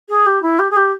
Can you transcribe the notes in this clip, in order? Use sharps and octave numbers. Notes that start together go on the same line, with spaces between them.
G#4
G4
E4
G4
G#4
G4